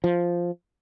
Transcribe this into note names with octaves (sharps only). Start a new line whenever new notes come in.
F3